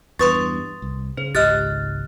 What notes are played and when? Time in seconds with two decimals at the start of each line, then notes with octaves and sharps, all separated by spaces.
0.19 E2 G2 B4 C6 C#6 D#6 A6
0.82 C2
1.17 C#3 C5
1.35 G#1 C#2 G4 D#5 F6 F#6 A6